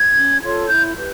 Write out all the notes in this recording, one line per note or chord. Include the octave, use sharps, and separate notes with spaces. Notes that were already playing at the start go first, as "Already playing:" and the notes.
Already playing: G#6
C#4
F4 A4 C#5
G#6
E4 G6
G4 B4